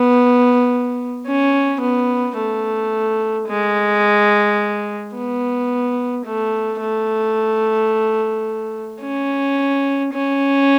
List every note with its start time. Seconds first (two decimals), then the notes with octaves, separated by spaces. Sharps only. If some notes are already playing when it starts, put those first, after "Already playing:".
Already playing: B3
1.27 C#4
1.81 B3
2.37 A3
3.48 G#3
5.14 B3
6.26 A3
6.81 A3
9.02 C#4
10.13 C#4